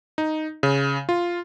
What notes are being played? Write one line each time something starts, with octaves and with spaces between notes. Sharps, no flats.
D#4
C#3
F4